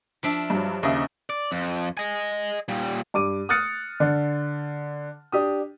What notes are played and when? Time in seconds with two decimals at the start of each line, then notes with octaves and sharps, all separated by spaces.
0.23 F3 D4 E5
0.50 G2 F#3
0.83 D#2 C#3 D#5 E5
1.30 D5
1.52 F2
1.97 D#5 G#5
2.68 A#2 G3
3.14 G2 D6 D#7
3.49 D#6 F6 F#6 A6 C#7
4.00 D3
5.32 D4 G4 D#6